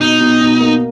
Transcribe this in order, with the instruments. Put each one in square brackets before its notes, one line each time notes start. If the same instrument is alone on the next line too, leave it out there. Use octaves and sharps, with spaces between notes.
[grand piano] B2 [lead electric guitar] D#4
[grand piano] B2
B2
A#3